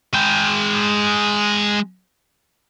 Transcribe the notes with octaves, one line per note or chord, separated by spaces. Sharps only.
G#3 G5